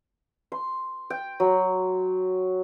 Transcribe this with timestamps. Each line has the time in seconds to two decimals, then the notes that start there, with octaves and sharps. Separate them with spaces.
0.52 C6
1.10 G5
1.40 F#3